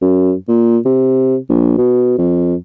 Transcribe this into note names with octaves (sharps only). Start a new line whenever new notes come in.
F#2
A#2
C3
A#1
B2
F2